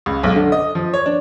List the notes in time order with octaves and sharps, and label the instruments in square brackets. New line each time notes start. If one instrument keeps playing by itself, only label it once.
[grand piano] C#2
B1
D3
D#5
F3
C#5
D4